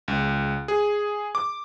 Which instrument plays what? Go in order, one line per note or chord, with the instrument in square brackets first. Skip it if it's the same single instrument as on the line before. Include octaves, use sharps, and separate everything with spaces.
[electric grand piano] C#2
G#4
D6